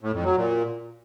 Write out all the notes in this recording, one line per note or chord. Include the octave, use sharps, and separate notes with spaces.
A2
F2
F#3
A#2